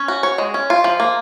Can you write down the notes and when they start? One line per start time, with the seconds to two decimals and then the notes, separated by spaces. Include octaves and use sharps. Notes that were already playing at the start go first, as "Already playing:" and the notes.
Already playing: C#4
0.08 F#4
0.23 C#5
0.38 G#3
0.54 C#4
0.70 F4
0.84 F3
1.00 A#3